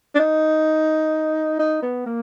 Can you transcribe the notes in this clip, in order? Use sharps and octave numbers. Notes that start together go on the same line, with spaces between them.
D4
D#4
D#4
B3
A#3